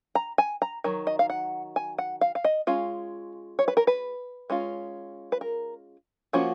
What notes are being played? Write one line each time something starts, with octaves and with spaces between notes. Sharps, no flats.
A#5
G#5
A#5
D#3 F#3
D#5
F5
F#5
G#5
F#5
F5
F5
D#5
G#3 C#4 F4 F5
C#5
B4
A#4
B4
G#3 C#4 F4
B4
A#4
F3 A#3 C#4 F4 F#4